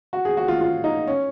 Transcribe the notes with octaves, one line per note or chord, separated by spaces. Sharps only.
F#4
G#4
F#4
F4
F4
D#4
C#4